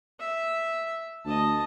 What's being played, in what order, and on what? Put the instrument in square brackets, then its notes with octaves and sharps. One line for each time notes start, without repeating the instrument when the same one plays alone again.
[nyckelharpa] E5
[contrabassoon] D2 [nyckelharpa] D#5 A5